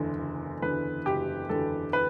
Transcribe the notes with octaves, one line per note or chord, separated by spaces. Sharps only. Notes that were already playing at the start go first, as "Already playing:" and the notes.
Already playing: F#1 E2 D3
F#1
E2 D3 B4
F#1 G4
E2 D3 A4
B4